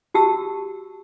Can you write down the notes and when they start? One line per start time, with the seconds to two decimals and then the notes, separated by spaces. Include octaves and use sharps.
0.14 F#4 G4 A5 E6